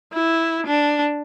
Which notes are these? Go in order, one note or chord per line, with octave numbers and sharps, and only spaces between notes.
E4
D4